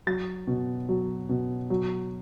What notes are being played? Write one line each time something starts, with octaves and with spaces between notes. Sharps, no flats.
F#3 A6
B2
F#3
B2
F#3